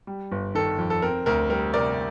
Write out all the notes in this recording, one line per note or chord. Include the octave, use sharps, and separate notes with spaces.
G3
G1
D#3 A4
F2
A4
C4 A#4
D2 A#4
G3 A#4
C3 A#4 D5